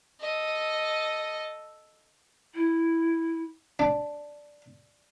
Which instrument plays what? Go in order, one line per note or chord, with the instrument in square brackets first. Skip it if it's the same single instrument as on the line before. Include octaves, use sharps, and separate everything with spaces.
[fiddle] A4 D#5
[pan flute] E4
[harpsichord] D4 [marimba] D5 A5